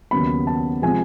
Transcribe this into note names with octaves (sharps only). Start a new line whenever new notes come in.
D#2 C#3 F#3 B3 B5
A5
C3 F3 G#3 G#5